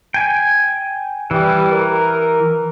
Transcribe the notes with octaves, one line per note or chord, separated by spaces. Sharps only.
G5 G#5
E3 G3
A#4